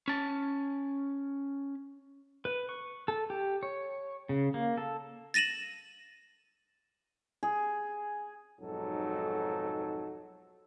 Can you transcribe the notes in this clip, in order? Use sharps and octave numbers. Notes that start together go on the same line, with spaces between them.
C#4 A5
B4
C#6
A4
G4
C#5
C#3
A#3
A4
A6 A#6 D#7 E7 F#7
G#4
B1 F2 G#2 F#3 D#4 A4